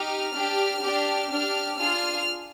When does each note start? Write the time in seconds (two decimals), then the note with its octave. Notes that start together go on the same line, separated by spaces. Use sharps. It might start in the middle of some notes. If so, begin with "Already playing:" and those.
Already playing: D#4 G4 F6
0.35 D4 G4
0.83 D4 G4
1.30 D4 G4 F6
1.77 D4 F4 G#4 F6